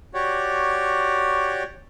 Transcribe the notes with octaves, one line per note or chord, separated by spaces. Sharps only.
F#4 G4 C#5 D5